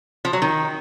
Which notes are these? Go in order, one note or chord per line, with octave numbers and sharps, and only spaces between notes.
F3
F#3
D#3